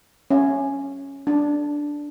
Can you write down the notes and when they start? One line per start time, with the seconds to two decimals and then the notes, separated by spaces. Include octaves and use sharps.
0.31 C#4
1.27 D4